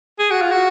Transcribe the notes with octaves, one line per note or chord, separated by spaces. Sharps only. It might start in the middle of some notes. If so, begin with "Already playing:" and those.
G#4
F#4
F4
F#4